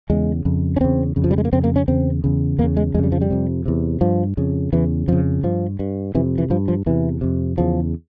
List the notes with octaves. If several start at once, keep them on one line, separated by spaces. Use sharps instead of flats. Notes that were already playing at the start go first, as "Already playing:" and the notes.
E2 C#3 G#3
F2 C#3
C#4
E2 C#3 C4
F2 C#3
F3
G3
G#3
A#3
F2 C#3 C4
A#3
C#4
E2 C#3 C4
E2 C#3
E2 C#3 A#3
G#3
F2 C#3 G3 G#3
F3
G3
F2 C3
E2 C3
G2 F3
F2 C#3
E2 C#3 E3
F2 C#3 F3
G2 F3
G2
F2 C3 E3
E3
G2 F3
F3
E2 C3 E3
F2 C3
E2 C#3 F3